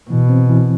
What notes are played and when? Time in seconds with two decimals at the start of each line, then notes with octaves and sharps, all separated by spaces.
0.10 B2 E3
0.29 C4
0.49 E3